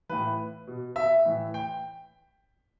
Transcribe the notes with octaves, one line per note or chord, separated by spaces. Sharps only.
A2 E3 B4
B2
E5
A2 E3
G5